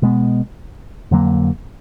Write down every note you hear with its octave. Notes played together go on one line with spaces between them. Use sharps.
B2 G#3 B3
F2 D3 F#3 A#3